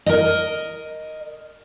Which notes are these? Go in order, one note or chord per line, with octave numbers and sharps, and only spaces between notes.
A#4 D#5